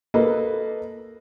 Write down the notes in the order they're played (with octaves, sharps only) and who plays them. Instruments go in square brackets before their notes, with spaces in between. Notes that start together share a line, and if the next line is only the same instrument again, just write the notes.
[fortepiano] A#3 A4 B4 D#5